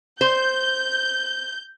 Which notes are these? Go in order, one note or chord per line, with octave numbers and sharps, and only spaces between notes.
C5 G6